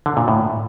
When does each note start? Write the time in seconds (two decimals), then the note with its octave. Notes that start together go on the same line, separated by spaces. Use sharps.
0.06 D3
0.17 A#2
0.28 A2